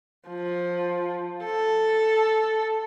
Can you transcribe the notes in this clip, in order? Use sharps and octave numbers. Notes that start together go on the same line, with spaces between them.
F3
A4